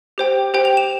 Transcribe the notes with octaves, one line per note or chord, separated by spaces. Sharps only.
G4 C5 G5
G4 C5 G5
F7
E7